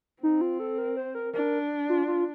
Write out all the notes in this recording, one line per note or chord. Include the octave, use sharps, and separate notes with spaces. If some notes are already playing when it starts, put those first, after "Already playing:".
C4 D#4
F4
A4
A#4
C5
A#4
D4 A#4
F4
F4